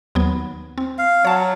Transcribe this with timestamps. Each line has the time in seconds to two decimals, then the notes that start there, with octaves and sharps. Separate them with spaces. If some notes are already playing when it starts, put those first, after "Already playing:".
0.15 D#2 F#3 B3
0.78 C4
0.99 F5
1.25 F#3 C#5 A5